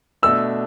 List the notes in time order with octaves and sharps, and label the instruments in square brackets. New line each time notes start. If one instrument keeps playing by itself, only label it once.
[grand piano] B2 A3 D4 [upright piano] E6